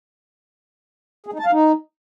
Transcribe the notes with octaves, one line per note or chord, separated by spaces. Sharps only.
G#4
D#4
A5
F5
D#4